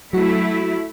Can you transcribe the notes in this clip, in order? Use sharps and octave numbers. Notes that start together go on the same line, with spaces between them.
F#3 A3 E4 F#4